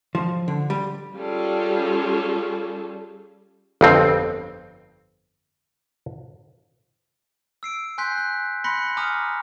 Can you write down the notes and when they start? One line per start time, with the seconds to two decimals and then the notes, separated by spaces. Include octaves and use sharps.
0.15 F3
0.48 D3
0.70 G3
1.17 G3 C#4 F4 G#4 A4
3.81 G1 F2 C4
7.63 E6 C7 D7
7.98 G#5 C6 F#6 G6 B6 C7
8.18 F#6
8.64 B5 C6 F#6 A#6 B6 C#7
8.97 G#5 A#5 D6 D#6 F6